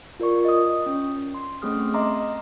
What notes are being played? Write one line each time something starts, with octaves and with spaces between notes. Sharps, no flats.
F4 A#4 D5 C#6
D#5 D#6
C#4
C6
A3 C4 C#4 G#4 D#6 F6
D#5 E5 A#5 C6 D6